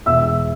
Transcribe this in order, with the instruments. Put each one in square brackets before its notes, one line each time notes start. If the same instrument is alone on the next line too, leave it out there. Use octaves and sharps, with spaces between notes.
[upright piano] E1 E5 E6